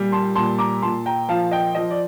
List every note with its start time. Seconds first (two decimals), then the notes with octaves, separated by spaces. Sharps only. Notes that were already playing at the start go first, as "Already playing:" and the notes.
Already playing: A#2 G3
0.12 A5 C6
0.35 A#2 A5 C6
0.59 A#5 D6
0.82 A#2 A5 C6
1.06 G5 A#5
1.29 F3 F5 A5
1.51 D#5 G5
1.75 F3 D#5
1.91 D5